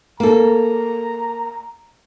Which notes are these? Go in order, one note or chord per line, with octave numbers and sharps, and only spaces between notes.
A#3 A4 A#5